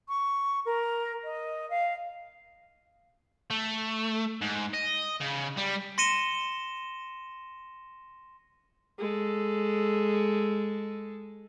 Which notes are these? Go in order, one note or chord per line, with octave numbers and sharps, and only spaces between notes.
C#6
A#4
D#5
F5
A3
G#2
D#5
C#3
G3
C6 A#6 C#7 D#7 E7 G7
G#3 A4